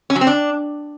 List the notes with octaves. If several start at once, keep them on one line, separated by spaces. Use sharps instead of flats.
C#4
F#3
C4
D4